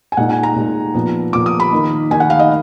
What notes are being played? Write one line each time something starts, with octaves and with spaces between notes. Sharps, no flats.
G#5
A#2 G#3 D#4 F#5
G#5
A#5
A#2 G#3 D#4
A#2 F3 B3
A#2 F3 B3 D6
D#6
B5
D#3 A#3 D#4
D#3 A#3 D#4 G#5
F#5
F5
D#5